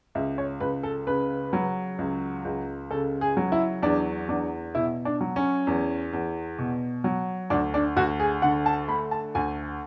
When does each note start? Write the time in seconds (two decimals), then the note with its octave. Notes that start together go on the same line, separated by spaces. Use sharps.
0.15 C#2 E5
0.38 C#5
0.60 C#2 B4
0.83 A4
1.07 C#3 B4
1.53 F#3
1.98 C#2
2.45 C#2
2.91 C#3 A4
3.21 G#4
3.37 F#3
3.52 E4
3.83 E2 D4
4.29 E2 D4
4.75 B2 E4
5.05 D4
5.21 F#3
5.36 C#4
5.67 E2
6.13 E2
6.59 B2
7.04 F#3
7.50 D2 D4
7.74 D4
7.96 D2 F#4
8.20 G#4
8.42 D3 F#5
8.66 A5
8.88 A3 B5
9.11 A5
9.35 D2 G#5